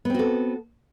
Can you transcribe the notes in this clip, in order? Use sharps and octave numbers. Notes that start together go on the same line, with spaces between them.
B3 C4 F#4 A4